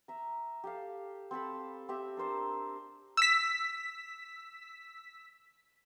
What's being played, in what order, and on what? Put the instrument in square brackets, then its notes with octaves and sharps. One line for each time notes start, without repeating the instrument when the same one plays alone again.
[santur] E5 A#5
G4 A4 F5
C4 A4 A5 B5
C4 G4 E5
D4 A#4 C5 A5
[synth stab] E6 B6